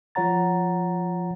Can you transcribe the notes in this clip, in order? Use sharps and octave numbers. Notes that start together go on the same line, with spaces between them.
F3 F4 C#5 F#5 A#5 A6